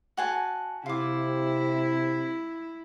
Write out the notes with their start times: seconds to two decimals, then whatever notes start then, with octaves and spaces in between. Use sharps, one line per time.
0.17 F#4 G#5 A5
0.86 C3 E4 F4 D6